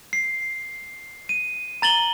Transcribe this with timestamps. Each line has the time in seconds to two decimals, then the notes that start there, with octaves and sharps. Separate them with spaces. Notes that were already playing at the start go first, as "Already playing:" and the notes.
0.13 C7
1.29 D#7
1.82 A#5 A6 F#7 G7